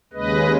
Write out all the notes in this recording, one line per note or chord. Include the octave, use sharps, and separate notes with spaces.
D#2 C#3 G#3 B4 D#5